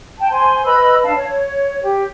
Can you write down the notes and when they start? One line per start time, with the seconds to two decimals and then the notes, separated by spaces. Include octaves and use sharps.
0.19 G5 A5
0.31 C5 G#5 C6
0.65 B4 D#5 B5 E6
1.03 D4 F5 A5
1.15 C#5
1.82 G4